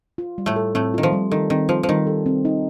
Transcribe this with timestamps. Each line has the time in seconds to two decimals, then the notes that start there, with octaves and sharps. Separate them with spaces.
0.18 F4
0.38 G3
0.46 A2 A3
0.56 A4
0.75 A2 A3 C4
0.94 D#3 F4
1.03 F3
1.12 G3
1.31 D#3 A4
1.50 D#3 C4
1.69 F3 F4
1.83 F3
1.89 D#3 G3
2.07 A4
2.26 C4
2.45 D#4